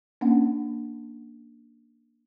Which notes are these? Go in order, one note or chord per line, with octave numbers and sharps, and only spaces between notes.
A#3 C#4 D4 F#5